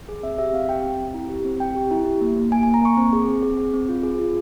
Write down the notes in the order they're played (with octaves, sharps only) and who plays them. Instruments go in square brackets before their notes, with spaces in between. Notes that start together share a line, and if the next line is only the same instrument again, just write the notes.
[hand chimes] G#4
C4 E5
G4 E5
C4 F5
G4 G5
C4
C4
E4
G4
C4
C4 G5
G4
E4
G4
A#3
A#3
A#3 G#5
G#5
A#3
A#5
A#3 C#6
C4
G#4
C4
G#4
C4
C4
F4
G#4
F4